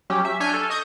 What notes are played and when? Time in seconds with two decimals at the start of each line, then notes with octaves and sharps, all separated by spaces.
0.10 F#3 C#4 G4
0.25 E5
0.40 D4 C#5 G#5 F6 G6
0.54 A4
0.70 D#5 C#6 D#6 G6